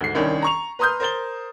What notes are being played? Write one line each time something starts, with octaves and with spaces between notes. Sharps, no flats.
D2 G#2 C7
C2 D#3 C#4 D4
A#5 C#6 F7
B4 A#5 C6 D#6 F6 G6
A#4 C5 A6 G7